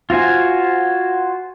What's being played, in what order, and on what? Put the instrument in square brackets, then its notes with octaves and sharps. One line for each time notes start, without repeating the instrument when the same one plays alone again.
[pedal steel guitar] F4 F#4 C5 G#5